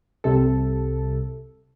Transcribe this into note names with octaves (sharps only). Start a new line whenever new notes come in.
C2 C3 A4